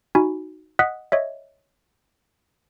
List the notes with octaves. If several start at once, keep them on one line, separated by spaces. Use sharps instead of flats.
D#4 F#4 G#5 B5
D#5 F#5 D#6 F#6 B6
C#5 D#5 E5